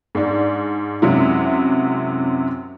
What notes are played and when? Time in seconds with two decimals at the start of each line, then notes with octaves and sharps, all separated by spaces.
0.15 G#2 D4
1.02 F#2 C3 F#3 G#3 E4